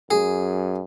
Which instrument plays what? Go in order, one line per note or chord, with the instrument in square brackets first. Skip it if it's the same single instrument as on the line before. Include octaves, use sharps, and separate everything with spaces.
[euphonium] F#2 [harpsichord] G#4